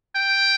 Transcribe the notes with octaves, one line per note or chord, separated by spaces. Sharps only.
G5